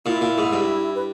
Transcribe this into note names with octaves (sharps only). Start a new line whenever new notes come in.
A#2 E4
A#2
G#2
G2
B4